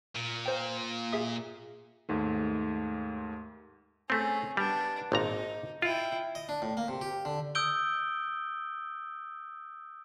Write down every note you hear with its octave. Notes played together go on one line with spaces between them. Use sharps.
A#2
C5 G5
G#4 E5 D#6
D#2 G#2 A3
A3 C4 C#4 G#4
G3 B3 D4
G#1 A#2 D#4 A#5
E4 F4 G5
D#5
D4
A2
A#3
C3
G4
D3
D#6 E6 G6 D7 G7